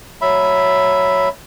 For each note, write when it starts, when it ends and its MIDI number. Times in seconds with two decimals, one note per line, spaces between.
0.22 1.29 54
0.22 1.29 76
0.22 1.29 83